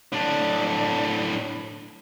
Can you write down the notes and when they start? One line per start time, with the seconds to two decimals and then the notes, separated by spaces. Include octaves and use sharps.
0.13 A2 D4